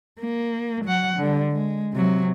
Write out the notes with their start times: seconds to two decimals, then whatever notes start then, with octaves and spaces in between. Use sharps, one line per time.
0.19 A#3
0.85 F#3 F#5
1.17 D3 G3
1.52 G#3
1.93 C3 F#3